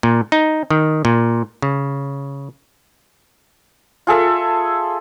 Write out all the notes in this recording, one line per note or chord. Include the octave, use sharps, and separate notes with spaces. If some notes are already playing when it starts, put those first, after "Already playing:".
A#2
D#4
D#3
A#2
C#3
F4 G#4 A4 E5